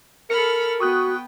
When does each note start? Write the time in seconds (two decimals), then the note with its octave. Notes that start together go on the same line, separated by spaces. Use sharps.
0.30 A4 A#4 B5 F6 C#7
0.80 B3 F#4 G5 C#6 D#6 F#6